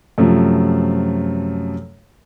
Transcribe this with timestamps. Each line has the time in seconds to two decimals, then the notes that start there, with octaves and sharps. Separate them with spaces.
0.18 F#2 C3 F3 A3